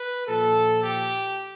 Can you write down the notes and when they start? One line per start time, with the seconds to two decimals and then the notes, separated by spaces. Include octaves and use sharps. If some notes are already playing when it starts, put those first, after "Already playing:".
Already playing: B4
0.28 A#2 F3 A4
0.83 G4